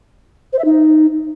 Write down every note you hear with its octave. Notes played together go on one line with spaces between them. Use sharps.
C5
E5
D#4